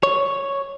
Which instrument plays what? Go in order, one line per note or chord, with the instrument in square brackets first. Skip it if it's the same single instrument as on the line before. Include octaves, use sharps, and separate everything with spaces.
[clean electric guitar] C#5